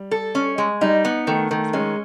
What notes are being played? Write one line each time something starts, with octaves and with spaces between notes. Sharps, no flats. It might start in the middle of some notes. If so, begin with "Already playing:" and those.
Already playing: G3
A4
C#4
G#3
G3 D#4
B3
D#3 A3
D#3 A3
G#3 C#4